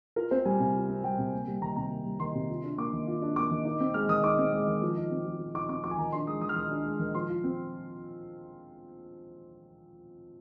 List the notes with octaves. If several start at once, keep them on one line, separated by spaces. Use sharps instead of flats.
F4 A#4
C4 C5
G3 G#5
C3 G#5
F4
C4
G3 G5
C3
A#3
G3
D#3 A#5
C3 A#5
A#3
G3
D#3 C6
C3
F4
D4
A#3 D6
D#3
F4
D4
A#3 D6
D#3
D#4
C4
G#3 F6
D#3 D#6
D#4 D6
C4
G#3
D#3
F3
D#4
C4
F3
F3
D#4 D6
C4 D6
F3 D6
G#5
D#3 A#5
D4 C6
G#3 D#6
D#3 D#6
F6
D#3 D#6
D4
G#3
D#3
F3 C6
F4
C4